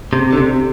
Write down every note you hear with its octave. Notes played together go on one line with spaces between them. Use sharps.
C3
D3
C3